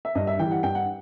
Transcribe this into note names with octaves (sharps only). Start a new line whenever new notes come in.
E5
G2 D#5
E5
E3 G3 G5
F#5
G2 G5
F#5